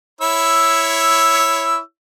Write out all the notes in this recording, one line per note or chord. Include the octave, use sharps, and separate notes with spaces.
E4 C#5 E6